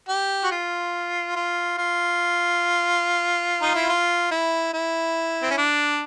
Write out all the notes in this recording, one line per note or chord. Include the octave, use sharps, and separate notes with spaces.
G4
F#4
F4
F4
F4
D#4
E4
F4
E4
E4
C4
C#4
D4